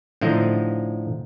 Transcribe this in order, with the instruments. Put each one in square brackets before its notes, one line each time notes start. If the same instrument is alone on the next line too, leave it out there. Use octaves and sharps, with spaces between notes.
[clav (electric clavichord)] A2 D3 F3 D#4 A#5